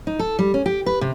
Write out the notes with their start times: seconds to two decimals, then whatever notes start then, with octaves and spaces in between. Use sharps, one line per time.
0.07 D#4
0.19 A4
0.39 G3
0.54 C#4
0.66 G4
0.86 B4
1.01 C3